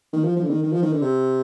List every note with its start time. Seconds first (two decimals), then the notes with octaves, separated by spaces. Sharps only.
0.13 D#3
0.24 F3
0.36 F3
0.43 D3
0.50 D#3
0.63 D#3
0.72 F3
0.82 D#3
0.92 D3
1.02 C3